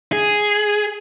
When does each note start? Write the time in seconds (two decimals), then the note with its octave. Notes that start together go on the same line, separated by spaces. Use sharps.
0.13 G#4